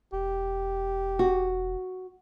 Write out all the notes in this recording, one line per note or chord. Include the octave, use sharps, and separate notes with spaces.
E1 G4
F#4